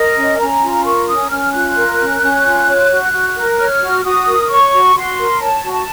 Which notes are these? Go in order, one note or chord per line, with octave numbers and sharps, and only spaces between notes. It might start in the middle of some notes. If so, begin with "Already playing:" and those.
Already playing: A#4 D#5
C#4
C#4 A#5
F4
A#4 C#6
C#4 D#6
C#4 F6
F4 F#6
A#4
C#4
C#4
F4
C#5
F#4
F#4
A#4
C#5 F6
F#4
F#4 D#6
A#4
C#5 C#6
F#4
F#4 C6
A#4
C#5 A5
F#4
A5